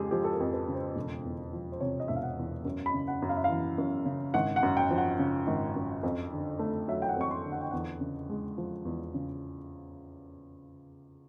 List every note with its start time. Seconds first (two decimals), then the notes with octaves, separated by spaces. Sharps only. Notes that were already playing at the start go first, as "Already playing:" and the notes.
Already playing: F2 C#3 G#3 G4 G#4
0.11 F3 G4
0.24 A4
0.33 A#4
0.40 F2
0.53 B4
0.68 C#3
0.75 C5
0.96 E1
1.25 E2
1.53 F3
1.72 C5
1.80 C3 C#5
2.00 D#5
2.08 E1 E5
2.16 F5
2.23 F#5
2.38 E2
2.65 F#2
2.86 B5
2.94 C#3
3.08 F#5
3.22 F#2
3.29 F5
3.37 E5
3.44 F5
3.49 E3
3.78 F#2
4.06 C#3
4.34 G#1 F#5
4.56 F#5
4.63 F#2
4.77 G5
4.91 F3
4.98 F#5
5.19 C#3
5.47 G#1
5.76 F#2
6.03 F2
6.32 D3
6.59 A3
6.88 F#3 E5
7.02 G5
7.09 F#5
7.16 F2 C#6
7.31 C6
7.45 D3
7.52 F#5
7.61 G5
7.71 E2 F#5
8.01 C#3
8.29 G#3
8.58 F3
8.85 E2
9.14 C#3